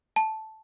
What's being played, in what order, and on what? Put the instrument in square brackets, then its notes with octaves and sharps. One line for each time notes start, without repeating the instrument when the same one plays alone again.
[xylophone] A5